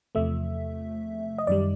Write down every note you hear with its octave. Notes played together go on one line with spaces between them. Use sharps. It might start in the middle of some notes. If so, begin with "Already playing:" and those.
E2 C3 F3 A3 E5
D#5
F#2 D#3 G3 D5